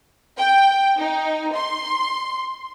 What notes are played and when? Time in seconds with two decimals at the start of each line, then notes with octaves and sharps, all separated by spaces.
0.38 G5
0.99 D#4
1.54 C6